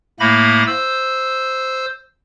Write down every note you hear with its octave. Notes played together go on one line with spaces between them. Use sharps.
A2 A3 A#3 B5 A#6
C5 E6